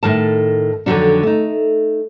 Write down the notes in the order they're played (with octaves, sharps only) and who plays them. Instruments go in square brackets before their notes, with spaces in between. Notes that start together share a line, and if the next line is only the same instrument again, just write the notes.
[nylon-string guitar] A2 D#3 A#4 A5
F2 D3 D#3 F3 F#3 D4
A3 D#4